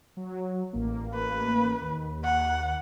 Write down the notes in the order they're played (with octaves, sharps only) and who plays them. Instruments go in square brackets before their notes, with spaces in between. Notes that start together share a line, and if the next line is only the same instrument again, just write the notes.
[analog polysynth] F#3
A1 A#3
[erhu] B4
[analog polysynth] D#2
[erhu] F#5